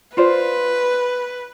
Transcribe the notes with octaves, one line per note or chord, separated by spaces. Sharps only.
F4 B4 C5 D5